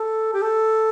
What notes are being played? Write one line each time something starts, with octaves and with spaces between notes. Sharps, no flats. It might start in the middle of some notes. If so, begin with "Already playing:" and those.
Already playing: A4
G4
A4